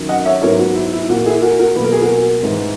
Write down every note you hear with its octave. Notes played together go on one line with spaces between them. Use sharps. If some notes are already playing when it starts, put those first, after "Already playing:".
Already playing: F#2 D#3 F#3
D#5 F#5
C#5 E5
G#2 F#3 B3 A#4 C#5
F#4
E4
E4
A#2 A#3 F#4
E4 G#4
F#4 A#4
F#4 A#4
B2 F#3 A#3 B4
A#4
G#4
F#4 A#4
G#2 E3 G#3